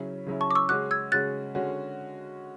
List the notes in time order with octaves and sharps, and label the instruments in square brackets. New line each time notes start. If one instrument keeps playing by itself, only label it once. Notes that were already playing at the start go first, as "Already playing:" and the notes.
Already playing: [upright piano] C#3 F#3 C#4 E4
C#3 F#3 C#4 E4
[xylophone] A5 C#6
D6
C#6 E6
[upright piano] C#3 G#3 C#4 F#4 [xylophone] D6 F#6
[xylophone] E6 G#6
[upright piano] C#3 G#3 C#4 F#4 [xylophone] F#6 A6
[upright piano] D3 G#3 C#4 F#4